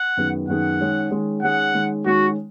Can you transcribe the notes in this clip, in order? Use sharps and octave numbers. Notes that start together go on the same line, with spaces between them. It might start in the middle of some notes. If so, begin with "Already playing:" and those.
Already playing: F#5
F#2 D#3 B3 G#4
F#2 D#3 B3 G#4 F#5
D#3 G#3 C#4 G#4
D#3 G#3 C#4 G#4
D#3 G#3 C#4 G#4 F#5
D#3 G#3 C#4 G#4
D#3 G#3 C#4 F#4